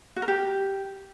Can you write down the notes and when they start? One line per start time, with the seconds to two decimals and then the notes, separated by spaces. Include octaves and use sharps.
0.16 F#4
0.22 A#4
0.28 G4